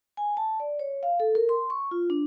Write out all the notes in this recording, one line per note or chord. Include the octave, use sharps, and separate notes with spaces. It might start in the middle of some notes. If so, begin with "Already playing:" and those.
G#5
A5
D5
C#5
F5
A4
A#4
C6
C#6
F4
D4